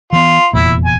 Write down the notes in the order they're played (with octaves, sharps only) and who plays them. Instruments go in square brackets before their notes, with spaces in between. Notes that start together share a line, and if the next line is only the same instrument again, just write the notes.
[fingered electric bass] E3 B3 [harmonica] F4
[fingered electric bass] F1 E2 A#2 [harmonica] E4
[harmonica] G#5